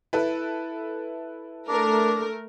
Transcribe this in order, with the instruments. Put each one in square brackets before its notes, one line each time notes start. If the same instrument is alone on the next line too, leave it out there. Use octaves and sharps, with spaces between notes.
[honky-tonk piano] E4 A4 B4
[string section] A3 A#4 [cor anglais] D4